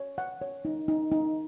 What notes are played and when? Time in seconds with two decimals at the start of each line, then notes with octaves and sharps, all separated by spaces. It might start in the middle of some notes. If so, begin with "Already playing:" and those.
Already playing: C#5
0.18 F#5
0.41 C#5
0.65 D#4
0.88 D#4
1.12 D#4